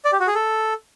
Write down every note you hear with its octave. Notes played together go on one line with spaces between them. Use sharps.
D5
G4
F#4
G#4
A4